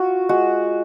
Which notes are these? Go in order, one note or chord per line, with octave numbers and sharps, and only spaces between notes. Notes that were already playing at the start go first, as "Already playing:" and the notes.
Already playing: F4 F#4
G#3 F#4